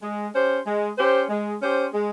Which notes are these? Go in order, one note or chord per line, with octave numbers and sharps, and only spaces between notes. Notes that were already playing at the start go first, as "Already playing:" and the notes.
G#3
C#4 G4 C5
G#3
C#4 G4 C5
G#3
C#4 G4 C5
G#3